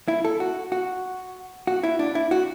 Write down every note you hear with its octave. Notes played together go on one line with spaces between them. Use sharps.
E4
A4
F#4
F#4
F#4
E4
D4
E4
F#4